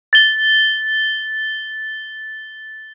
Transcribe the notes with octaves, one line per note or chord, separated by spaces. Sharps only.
A6 G7